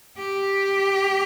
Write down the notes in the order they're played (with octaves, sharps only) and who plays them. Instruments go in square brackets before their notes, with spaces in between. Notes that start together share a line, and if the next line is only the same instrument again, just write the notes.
[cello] G4